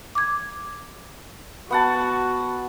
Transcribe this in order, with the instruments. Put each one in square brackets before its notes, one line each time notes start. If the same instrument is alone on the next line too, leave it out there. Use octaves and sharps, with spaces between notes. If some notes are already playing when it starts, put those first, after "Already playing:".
[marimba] D6 G#6
[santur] B3 F#5 A5 [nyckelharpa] F#4